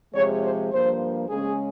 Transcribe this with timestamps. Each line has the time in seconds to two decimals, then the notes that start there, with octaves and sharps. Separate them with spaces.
0.14 C3 F3 G#3 C#5
0.42 C5
0.71 G2 F3 A#3 C5
1.28 C#3 G#3 C#4 G#4